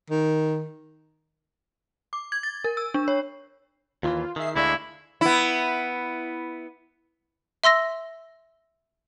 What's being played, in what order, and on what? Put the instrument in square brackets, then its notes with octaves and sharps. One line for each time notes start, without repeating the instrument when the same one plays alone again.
[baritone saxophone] D#3
[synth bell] D6
G#6
A6
A#4
E6
D4
C#5
[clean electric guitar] D#2 D#3 E3 [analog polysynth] F4
[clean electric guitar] D#3 [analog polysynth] G#4 E5 C7
[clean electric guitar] D2 D3 G#3 [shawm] E4 [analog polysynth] D5 F5 C#6
[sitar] B3 E4
[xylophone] E5 C6 E6 A#6